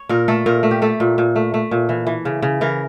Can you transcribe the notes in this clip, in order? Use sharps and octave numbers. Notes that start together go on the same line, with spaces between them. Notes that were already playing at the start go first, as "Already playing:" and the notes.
Already playing: C#5
A#2 A#4
A3 A4
A#2 A#4
A3
G4
A3 A4
A#2
A#2
A3
A3
A#2
E3
E3
C#3
C#3
E3 A#4